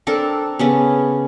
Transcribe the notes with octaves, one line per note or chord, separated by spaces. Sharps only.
C4 D4 A4 A#4
C#3 B3 C#4